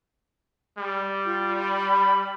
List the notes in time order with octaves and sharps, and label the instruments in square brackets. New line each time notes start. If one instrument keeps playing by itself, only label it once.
[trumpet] G3
[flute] F4
B5